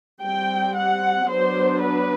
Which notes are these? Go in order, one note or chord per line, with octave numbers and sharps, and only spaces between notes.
G3 C4 G5
F#5
F#3 B3 D4 C5
B4